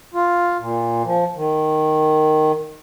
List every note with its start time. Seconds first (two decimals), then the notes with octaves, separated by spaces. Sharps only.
0.14 F4
0.60 A#2
1.05 F3
1.36 D#3